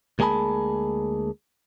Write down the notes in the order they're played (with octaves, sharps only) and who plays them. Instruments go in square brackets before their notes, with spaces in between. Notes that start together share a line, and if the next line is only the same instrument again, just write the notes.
[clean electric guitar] D2 G#3 A#3 G#4 A5 B5